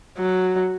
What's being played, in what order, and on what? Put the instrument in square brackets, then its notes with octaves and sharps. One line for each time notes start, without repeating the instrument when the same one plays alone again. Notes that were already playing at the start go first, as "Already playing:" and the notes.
[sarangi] F#3